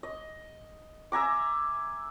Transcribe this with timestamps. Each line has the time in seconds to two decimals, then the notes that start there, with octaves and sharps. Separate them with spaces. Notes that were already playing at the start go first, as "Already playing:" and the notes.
0.03 D#5
1.12 E5 G#5 A#5 D6